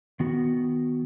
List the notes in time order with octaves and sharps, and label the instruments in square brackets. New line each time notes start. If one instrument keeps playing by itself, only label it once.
[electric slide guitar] D#3 B3 F#4